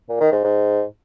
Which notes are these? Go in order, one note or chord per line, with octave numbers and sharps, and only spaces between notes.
A#2
D#3
G#2
G#2